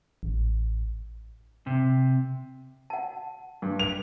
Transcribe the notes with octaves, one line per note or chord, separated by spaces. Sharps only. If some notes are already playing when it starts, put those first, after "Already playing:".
A1
C3
F#5 A5
G2
F7